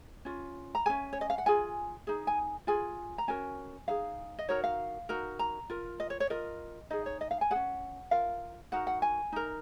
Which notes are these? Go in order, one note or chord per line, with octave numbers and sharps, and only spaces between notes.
C#4 F4
A#5
C#4 G#4 G#5
C#5
D#5
F5
F#5
F4 G#4 G#5
D#4 G#4
G#5
F4 G#4 G#5
A#5
C#4 F#4 A#4 G#5
D#4 G#4 F5
D#5
D#4 F#4 A#4 C#5
F5
D#4 F#4 A#4
A#5
F4 A#4
D#5
C#5
C#5
F4 A#4 D#5
D#4 G#4 D#5
C#5
D#5
F5
G#5
C#4 G#4 F#5
F4 A#4 F5
D#4 F#4 A#4 F#5
F#5
G#5
D#4 A#4